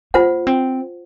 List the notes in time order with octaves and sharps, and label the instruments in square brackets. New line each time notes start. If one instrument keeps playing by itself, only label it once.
[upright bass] A#3 [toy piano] F4 C5 F#5
[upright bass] C4